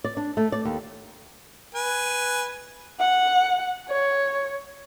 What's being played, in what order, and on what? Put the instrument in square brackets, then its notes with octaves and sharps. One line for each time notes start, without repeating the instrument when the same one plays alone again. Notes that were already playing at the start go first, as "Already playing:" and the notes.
[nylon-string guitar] D5
D4
A3
D5
D#2
[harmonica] B4 G#5
[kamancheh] F#5
C#5